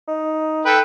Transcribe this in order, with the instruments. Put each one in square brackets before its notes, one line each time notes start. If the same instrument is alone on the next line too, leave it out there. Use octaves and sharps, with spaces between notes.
[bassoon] D#4
[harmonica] A4 B4 G5